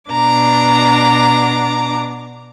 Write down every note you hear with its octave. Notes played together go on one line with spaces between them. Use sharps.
B2 D4 A#5 D6